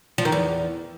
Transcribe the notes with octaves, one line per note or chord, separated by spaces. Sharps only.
F3
D#3
E2